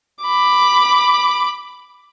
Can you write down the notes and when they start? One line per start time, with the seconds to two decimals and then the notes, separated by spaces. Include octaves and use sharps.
0.24 B5 D6